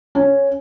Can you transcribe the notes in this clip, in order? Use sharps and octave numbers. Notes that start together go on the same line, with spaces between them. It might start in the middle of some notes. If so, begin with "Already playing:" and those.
C#4